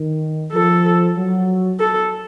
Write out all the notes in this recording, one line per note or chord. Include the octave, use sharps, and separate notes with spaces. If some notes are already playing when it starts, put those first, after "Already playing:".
Already playing: D#3
F3 A4
F#3
A4